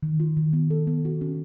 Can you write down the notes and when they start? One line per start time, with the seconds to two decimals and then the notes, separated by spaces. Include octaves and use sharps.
0.03 D#3
0.20 F4
0.37 D#3
0.53 B3
0.70 A4
0.87 B3
1.05 F#4
1.21 C#4